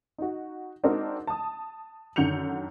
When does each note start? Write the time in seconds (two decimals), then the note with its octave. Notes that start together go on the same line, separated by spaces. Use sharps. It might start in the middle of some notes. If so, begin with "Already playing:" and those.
0.18 D#4 F#4
0.83 G#3 C4 D4 D#4 F#4 A#4
1.27 A5 D#6
2.16 F#2 D3 D#3 G6 C#7 F7